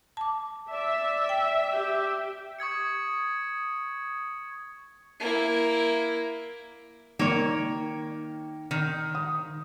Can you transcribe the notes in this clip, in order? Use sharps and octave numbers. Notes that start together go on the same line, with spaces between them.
A5 D6
D5 E5
G5
G4
C#6 D#6 G#6 C#7
A#3 E4
D#3 A#3 C#5
D#3
D#6